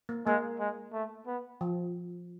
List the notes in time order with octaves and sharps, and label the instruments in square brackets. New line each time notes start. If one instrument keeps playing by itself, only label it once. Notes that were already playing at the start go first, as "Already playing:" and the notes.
[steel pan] A#3
[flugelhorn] G#3 [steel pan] A#3
[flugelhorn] G#3
A3
B3
[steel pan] F3